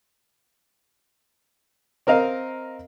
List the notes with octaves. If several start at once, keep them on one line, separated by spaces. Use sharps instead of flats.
C4 A#4 D#5 F5